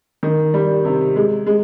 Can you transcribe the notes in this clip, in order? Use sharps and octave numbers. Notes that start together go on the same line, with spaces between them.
D#3
G3
C3
G#3
G#3